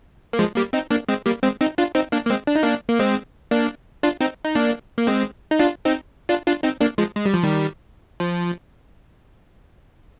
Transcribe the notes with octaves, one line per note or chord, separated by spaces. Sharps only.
A#3
F3 G#3
G3 A#3
C4 D#4
A#3 D4
G#3 C4
G3 A#3
G#3 C4
C4 D#4
D4 F4
C4 D#4
A#3 D4
A#3
G#3 C4
D4
D#4
A#3 D4
A#3
G#3 C4
A#3 D4
D4 F4
C4 D#4
D#4
A#3 D4
A#3
G#3 C4
D#4
D4 F4
C4 D#4
D4 F4
D4 F4
C4 D#4
A#3 D4
F3 G#3
G#3
G3
F3
D#3 G3
F3